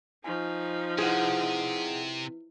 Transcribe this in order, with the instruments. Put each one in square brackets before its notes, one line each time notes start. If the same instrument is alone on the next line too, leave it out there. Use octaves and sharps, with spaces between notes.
[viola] F3 D#4 [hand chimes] G#5 C#6
[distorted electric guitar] C3 [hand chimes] E4 B4 [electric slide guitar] G#4 F#5